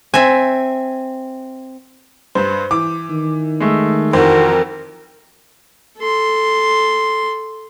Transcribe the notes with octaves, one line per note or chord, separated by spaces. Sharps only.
C4 E5 G#5
G2 B4 C5
E3 D6
D#3
G#3 A3
F2 E3 F#4 A#4 C5
A4 C6